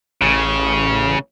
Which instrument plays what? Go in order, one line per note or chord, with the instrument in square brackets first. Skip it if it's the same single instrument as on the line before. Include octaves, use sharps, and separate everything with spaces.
[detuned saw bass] A1 [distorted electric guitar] C#3